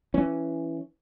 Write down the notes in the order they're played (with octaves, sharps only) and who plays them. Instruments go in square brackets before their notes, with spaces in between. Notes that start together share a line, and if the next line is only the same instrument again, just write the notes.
[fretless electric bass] E3 C#4